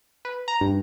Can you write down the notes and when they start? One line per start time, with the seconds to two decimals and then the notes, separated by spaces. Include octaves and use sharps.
0.25 B4
0.48 A#5
0.61 G2